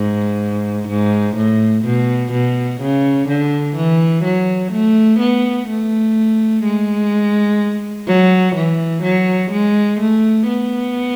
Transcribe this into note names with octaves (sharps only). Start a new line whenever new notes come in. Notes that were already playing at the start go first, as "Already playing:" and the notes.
Already playing: G#2
G#2
A2
B2
B2
C#3
D3
E3
F#3
A3
B3
A3
G#3
F#3
E3
F#3
G#3
A3
B3